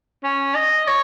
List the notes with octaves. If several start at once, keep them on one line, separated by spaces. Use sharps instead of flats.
C#4
D#5
C#5